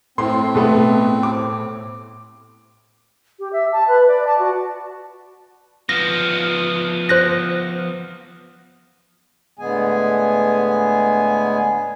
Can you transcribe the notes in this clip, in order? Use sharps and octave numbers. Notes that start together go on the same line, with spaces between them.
A2 C4 C6
B2 A3 B3
D6
G4
E5
A5
B4
D5
A5
F#4
F3 B3 A#6
C5 F#6 A#6
A2 D3 G#3 B3 G#4 G#5